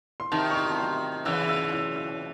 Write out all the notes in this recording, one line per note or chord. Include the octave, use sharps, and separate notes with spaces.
C6
C3 D#3 A5
C#6
C6
A5
C6
C#3 E3 E6
E6
E6
E6